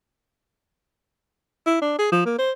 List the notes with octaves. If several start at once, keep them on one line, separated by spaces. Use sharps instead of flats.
E4
D4
G#4
F3
A#3
C5